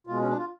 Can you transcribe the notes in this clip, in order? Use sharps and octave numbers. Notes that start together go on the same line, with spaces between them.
B2 G#3 F4
C#4
D4
F4